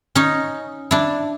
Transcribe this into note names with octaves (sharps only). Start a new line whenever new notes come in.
C#4 D#4
D4 E4